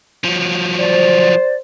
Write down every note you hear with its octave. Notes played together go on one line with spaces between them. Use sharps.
F3 F#3
C5 D5